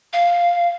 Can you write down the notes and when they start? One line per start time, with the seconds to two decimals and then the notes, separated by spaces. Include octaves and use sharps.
0.13 F5